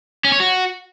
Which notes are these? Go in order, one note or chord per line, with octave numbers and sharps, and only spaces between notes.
C#4
C#5
F#4